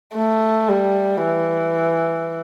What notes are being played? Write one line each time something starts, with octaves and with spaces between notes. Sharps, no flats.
A3
G3
E3